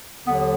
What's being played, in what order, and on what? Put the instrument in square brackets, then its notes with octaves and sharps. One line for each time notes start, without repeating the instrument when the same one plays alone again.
[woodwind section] D#2 D3 F#3 B3